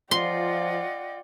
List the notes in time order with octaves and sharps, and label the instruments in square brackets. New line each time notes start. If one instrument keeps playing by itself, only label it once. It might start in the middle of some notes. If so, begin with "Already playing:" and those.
[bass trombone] F3 [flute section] F4 D#5 F#5 [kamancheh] D5 G5 [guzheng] C6